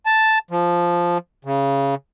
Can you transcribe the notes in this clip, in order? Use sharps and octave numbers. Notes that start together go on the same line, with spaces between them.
A5
F3
C#3